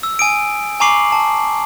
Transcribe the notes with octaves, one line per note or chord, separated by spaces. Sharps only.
E6
G#5 D#6 D7
G#5 A#5 C#6 D6 C7 F#7
A5